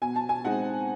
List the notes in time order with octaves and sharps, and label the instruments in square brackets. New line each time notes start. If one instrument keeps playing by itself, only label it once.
[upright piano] B2 G#5
A5
G#5
G#3 C4 D#4 F#5